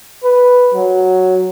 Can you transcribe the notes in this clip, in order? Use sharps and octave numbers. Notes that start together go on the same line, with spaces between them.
B4
F#3